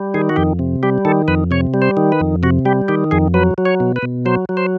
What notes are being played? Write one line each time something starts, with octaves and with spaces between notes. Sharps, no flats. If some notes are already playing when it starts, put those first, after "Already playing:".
Already playing: G3
D#3 G#4
F#4
F2 G4
C3
G3 G4
D#3 A4
F2 B4
C3 C#5
G3
C5
D#3
B4
F2
C3 F#4
G3 G4
D#3 G4
F2 G#4
F#3 B4
F#3
C#5
B2
B4
B2
F#3 C5
F#3
C5